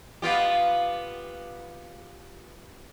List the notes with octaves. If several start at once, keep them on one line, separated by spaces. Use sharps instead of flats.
B3 F4 G4